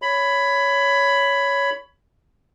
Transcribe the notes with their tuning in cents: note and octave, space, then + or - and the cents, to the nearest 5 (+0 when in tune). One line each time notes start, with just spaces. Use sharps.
C#5 +10 B5 +10